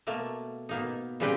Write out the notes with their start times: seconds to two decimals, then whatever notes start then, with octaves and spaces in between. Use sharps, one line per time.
0.07 B2 A3 A#3
0.69 B2 A#3 D#4
1.20 A#2 C#3 G3 C4 B4 G5